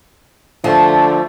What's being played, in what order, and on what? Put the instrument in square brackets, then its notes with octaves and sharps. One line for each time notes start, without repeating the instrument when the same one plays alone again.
[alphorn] D3 [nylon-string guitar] F3 [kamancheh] A3